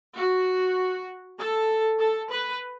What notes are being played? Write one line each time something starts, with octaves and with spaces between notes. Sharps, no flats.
F#4
A4
A4
B4